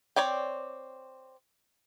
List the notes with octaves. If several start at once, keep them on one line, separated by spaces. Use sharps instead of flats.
C4 C#5 D5 G5